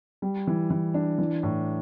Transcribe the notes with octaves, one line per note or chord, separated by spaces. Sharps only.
G3
E3
E3
D4
E3
A2